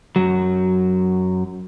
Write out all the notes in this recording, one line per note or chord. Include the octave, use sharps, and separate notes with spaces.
F#2 F#3